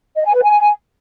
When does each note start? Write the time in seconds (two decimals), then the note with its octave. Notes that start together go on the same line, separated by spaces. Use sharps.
0.16 D#5
0.25 G#5
0.34 B4
0.43 G#5